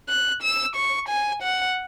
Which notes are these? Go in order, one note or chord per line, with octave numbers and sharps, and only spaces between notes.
F#6
E6
C#6
G#5
F#5